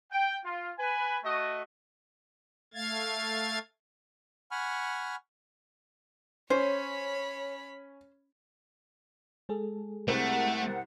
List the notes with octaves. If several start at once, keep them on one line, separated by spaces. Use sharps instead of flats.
G5
F4
B4 G#5
A3 F#4 D#5
A3 F5 G#6 A6
F#5 G#5 B5 C#6 F6
C#4 C5 C#5 B5
G#3 G#4 A4
C2 A3 C4 A#4 F#5